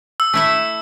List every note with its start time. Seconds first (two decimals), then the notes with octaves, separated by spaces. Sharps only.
0.20 E6
0.33 A3 E4 E5